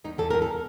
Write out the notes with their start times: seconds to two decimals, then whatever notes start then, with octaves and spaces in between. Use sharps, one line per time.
0.04 E2 D#4
0.18 E2 A4
0.31 E2 A#4
0.42 A4